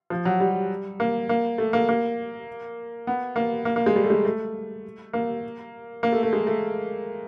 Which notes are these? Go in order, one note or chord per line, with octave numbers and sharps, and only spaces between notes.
F3
F#3
G3
A#3
A#3
A3
A#3
A#3
B3
A#3
A#3
A#3
G#3
G3
A3
G#3
A3
A#3
A#3
A3
A3
G#3
A3